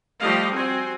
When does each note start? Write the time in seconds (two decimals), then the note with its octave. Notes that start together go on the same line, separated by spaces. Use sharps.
0.20 F3 G3 A3 G4 D#5 F5
0.53 C4 F#4 G#5